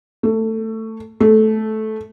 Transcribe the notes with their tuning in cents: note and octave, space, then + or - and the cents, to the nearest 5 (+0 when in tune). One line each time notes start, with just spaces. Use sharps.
A3 +15
A3 -15